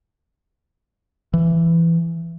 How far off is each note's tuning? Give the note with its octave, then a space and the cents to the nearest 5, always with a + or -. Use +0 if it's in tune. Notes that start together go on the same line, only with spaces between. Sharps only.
E3 +15